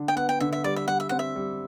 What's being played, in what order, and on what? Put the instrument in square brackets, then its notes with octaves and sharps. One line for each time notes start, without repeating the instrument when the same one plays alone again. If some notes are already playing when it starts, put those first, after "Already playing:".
Already playing: [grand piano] D3 D4
[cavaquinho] G5
[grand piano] B3 [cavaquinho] F#5
[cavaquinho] G5
[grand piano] D3 [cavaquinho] E5
[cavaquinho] E5
[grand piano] G3 [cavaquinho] D5
[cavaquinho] E5
[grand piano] G3 [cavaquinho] F#5
[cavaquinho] E5
[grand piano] C4 [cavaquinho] F#5
[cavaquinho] E5
[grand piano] G3